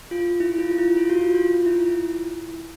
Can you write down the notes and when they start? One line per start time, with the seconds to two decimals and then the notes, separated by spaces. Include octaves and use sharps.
0.11 F4
0.40 E4
0.58 F4
0.71 F4
0.78 E4
0.97 F4
1.10 F#4
1.16 F4
1.35 F4
1.54 F4
1.66 E4
1.90 E4